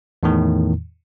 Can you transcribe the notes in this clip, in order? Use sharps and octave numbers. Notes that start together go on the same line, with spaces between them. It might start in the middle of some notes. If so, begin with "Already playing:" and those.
E2 A2 D#3